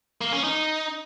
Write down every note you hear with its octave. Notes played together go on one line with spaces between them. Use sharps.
A#3
C#4
D#4